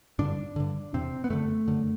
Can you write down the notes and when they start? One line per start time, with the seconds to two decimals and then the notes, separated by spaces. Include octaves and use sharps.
0.19 G2 D3 D4
0.56 G2 D3
0.94 E2 C3 C4
1.24 B3
1.30 F#2 D3 A3
1.68 F#2 D3